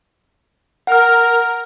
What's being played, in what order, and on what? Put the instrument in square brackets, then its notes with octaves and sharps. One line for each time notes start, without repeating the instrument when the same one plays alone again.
[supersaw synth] A#4 [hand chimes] F#5 F6